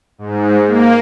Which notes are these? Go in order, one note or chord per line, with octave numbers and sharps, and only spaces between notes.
G#2
A#3